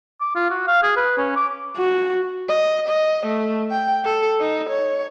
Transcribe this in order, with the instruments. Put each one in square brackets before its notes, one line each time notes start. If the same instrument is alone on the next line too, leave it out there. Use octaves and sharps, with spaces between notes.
[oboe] D6
F4
F#4
F5
G#4
B4
C#4
D6
[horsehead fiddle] F#4
[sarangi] D#5
D#5
A3
G5
A4
D#4
C#5